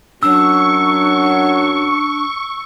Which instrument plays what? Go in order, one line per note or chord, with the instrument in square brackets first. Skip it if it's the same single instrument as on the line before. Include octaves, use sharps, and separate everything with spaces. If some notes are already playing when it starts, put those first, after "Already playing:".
[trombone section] F#2 F#3 [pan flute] D4 [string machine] C#6 [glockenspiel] E6